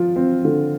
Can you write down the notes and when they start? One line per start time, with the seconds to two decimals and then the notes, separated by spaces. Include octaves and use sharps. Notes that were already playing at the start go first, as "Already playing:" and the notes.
Already playing: F3 F4
0.16 C4
0.45 D3